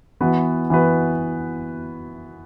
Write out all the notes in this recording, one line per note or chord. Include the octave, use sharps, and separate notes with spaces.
E3 B3 F#4 B4
E3 B3 F#4 B4